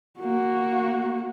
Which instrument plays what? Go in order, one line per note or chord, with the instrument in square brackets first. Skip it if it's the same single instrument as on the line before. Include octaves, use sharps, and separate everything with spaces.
[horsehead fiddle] A#3 F#4